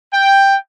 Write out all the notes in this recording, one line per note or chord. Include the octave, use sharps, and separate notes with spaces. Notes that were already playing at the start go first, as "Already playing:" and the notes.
G5